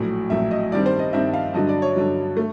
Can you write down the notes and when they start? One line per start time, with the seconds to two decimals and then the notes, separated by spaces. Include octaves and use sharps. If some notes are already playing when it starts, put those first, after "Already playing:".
Already playing: A#1 A2 F#3
0.30 A#1 A2 F#3 E5
0.51 D#5
0.72 G2 D#3 G3 C4 D5
0.86 C5
0.99 D#5
1.13 G2 D#3 G3 C4 E5
1.34 F5
1.54 G2 D3 F#3 D#5
1.69 D5
1.82 C#5
1.96 G2 D3 F#3
2.37 A3